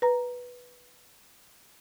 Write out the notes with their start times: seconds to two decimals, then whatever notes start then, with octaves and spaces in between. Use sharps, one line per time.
0.02 B4 A#5